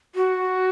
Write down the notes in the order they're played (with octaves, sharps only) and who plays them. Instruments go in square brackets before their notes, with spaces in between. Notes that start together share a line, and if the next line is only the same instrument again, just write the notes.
[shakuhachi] F#4